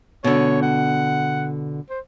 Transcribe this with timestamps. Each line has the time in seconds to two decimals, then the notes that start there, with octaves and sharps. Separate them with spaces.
0.24 B2 D3 C#5
0.62 F#5
1.90 C5